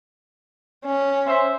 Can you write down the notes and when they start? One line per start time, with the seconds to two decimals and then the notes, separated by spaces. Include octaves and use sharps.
0.85 C#4
1.27 C5 E5